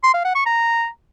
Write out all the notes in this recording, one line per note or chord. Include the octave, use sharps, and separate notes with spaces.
C6
F5
F#5
C#6
A#5